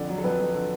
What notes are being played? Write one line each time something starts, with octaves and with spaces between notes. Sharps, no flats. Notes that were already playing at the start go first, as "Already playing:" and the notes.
Already playing: F2 D3 D5
F#3
A4
F2 B4
F2
D3